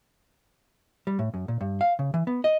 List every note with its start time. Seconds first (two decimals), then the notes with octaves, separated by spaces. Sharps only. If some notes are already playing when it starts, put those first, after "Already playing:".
1.07 G3
1.19 A2
1.34 F#2
1.48 A#2
1.61 G2
1.81 F5
1.99 C#3
2.14 E3
2.27 B3
2.44 D#5